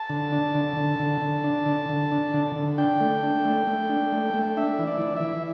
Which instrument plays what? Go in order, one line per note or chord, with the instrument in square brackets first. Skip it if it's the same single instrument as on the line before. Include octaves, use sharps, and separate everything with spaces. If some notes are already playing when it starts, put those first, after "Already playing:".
Already playing: [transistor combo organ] A5
D3
D4
D3
D3
D3
D3
D4
D3
D3
D4
D3
D3
D4 G5
A3
D4
A3
A3
D4
A3
A3
D4 E5
E3
D5
E3
E5
E3